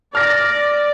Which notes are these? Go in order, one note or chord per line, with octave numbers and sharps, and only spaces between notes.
D5 F6 A#6